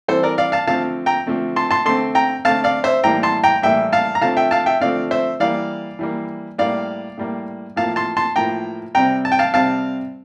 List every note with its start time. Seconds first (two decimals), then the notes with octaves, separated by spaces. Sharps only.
0.08 E3 G3 C4 A4 C5
0.23 A#4 D5
0.38 D5 F5
0.52 F5 A5
0.67 D3 F3 A3 C4 F5 A5
1.06 G5 A#5
1.27 D3 F3 A3 C4
1.56 A5 C6
1.71 A5 C6
1.85 D3 A3 C4 A5 C6
2.15 G5 A#5
2.45 D3 A3 C4 F5 A5
2.64 D5 F5
2.84 C5 E5
3.04 A2 E3 G3 A#3 G5 A#5
3.23 A5 C6
3.43 G5 A#5
3.62 A2 E3 G3 A#3 E5 G5
3.93 F5 A5
4.15 A#5
4.21 D3 F3 A3 C4 F5 A5
4.37 E5 G5
4.51 F5 A5
4.66 E5 G5
4.81 D3 F3 A3 C4 D5 F5
5.11 C5 E5
5.40 E3 G3 A#3 D5 F5
5.99 E3 G3 A#3
6.58 A2 G3 A#3 D5 F5
7.18 A2 G3 A#3
7.76 A2 F3 A#3 F5 A5
7.96 A5 C6
8.17 A5 C6
8.36 A2 F3 A#3 G5 A#5
8.95 C3 G3 C4 G5 A#5
9.25 A5
9.32 G5
9.39 F5 A5
9.54 C3 G3 C4 F5 A5